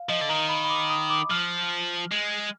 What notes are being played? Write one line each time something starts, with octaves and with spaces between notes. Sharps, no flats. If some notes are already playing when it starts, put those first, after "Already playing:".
Already playing: F5
F3 D#5
D3
D#3 A#5
B5
B5
D6
D#6
D6
F3 F6
G#3